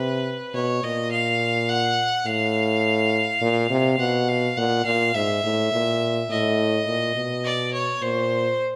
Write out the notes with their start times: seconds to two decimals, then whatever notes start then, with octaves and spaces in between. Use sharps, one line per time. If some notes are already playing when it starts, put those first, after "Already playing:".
Already playing: C3 B4
0.54 B2 C#5
0.83 A#2 D#5
1.12 F5
1.69 F#5
2.26 A2 F5
3.41 A#2
3.70 C3
3.99 B2 F#5
4.28 F5
4.57 A#2 F#5
4.85 A#2 F5
5.15 G#2 E5
5.43 A2
5.72 A#2
6.29 A2 D#5
6.87 A#2
7.15 B2
7.44 D5
7.73 C#5
8.02 A#2 C5